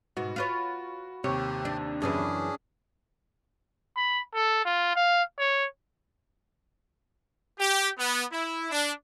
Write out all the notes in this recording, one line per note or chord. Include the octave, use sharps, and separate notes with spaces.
G#2 B2 F#4
F4 B4 C#5
D#2 C3 G4 C#5
D4
F#2 C#3 E3 C#4 D4 G#4
B5
A4
F4
F5
C#5
G4
B3
E4
D4